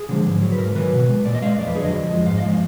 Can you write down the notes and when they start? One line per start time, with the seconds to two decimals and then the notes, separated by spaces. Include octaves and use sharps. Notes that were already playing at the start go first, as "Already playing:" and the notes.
Already playing: G#4
0.09 D3 F3 G#3
0.26 G#2
0.42 F#3
0.52 B4
0.59 G#2 A#4
0.75 D#3 F#3 B4
0.93 B2
1.09 G#3
1.26 A#2 D5
1.35 D#5
1.42 G#3 F5
1.51 D#5
1.59 F2 D5
1.67 B4
1.75 D3 F#3 G#4
1.85 D#5
1.92 F2
2.09 F3 G#3
2.26 G#2 F5
2.38 D#5
2.42 F3 G#3 F5